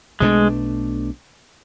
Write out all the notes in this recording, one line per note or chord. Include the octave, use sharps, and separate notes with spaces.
B1 B2 G#3 A3 D4